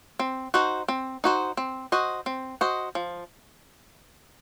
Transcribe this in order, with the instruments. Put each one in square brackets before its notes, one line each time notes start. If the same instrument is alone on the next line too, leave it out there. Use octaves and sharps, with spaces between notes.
[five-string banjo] C4
D#4 F#4 C5
C4
D#4 F#4 C5
C4
F#4 C5 D#5
C4
F#4 C5 D#5
F3